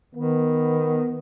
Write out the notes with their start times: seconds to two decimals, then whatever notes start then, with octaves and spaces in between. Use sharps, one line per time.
0.15 D#3 B3